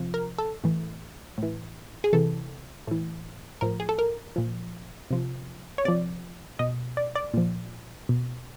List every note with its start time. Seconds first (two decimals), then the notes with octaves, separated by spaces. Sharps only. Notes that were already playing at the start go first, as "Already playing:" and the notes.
Already playing: C3 F3
0.14 A#4
0.38 A4
0.64 A2 E3
1.38 A2 E3
2.04 G#4
2.13 C3 E3 A4
2.87 A2 E3
3.61 A2 F3 A#4
3.80 G#4
3.89 A4
3.99 A#4
4.36 A#2 F3
5.11 C3 F3
5.78 C#5
5.85 C3 F3 D5
6.59 B2 D#5
6.97 D5
7.15 D5
7.34 A#2 F3
8.09 B2